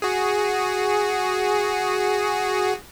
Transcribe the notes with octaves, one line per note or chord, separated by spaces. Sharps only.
F#4 G#4